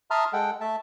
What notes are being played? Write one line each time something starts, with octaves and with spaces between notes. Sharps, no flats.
E5 A5 A#5 C6 D#6 F6
G#3 A4 F#5 G5
A3 E5 A5